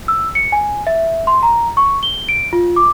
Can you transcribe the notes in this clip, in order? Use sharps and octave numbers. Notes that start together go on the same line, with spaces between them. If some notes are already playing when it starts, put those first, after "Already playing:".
E6
C#7
G#5
E5
C6
A#5
C#6
G7
D7
F4
D6